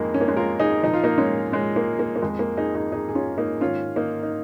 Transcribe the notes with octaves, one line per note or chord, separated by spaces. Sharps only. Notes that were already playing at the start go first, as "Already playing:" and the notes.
Already playing: F2 D#3 G#3 A#3 D#4
C#4
A#3
G#3 C#4
F4 A#4
D#4 G#4
A#2 F3 D#4
F4
A#3 D#4
G#3 C#4
G#3 C#4
A#3
A#3
A#3
F2 F3 G#3
A#3
D#4 G#4
D#4 G#4
D#4 G#4
G#4
C#4 F4
A#3 D#4
G#2 D#3 C#4 F4
A#3 D#4
D#4